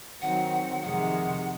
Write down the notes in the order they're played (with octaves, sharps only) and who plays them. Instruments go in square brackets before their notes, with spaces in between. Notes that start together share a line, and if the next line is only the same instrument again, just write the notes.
[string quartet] D#3 F#3 C4 D#4 F#4 [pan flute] F#5
[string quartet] F2 C3 D#3 G#3 [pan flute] F#5